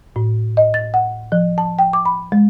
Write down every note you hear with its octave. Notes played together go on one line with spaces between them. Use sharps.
A2
D#5
A6
F#5
F3
A5
G5
D6
B5
G#3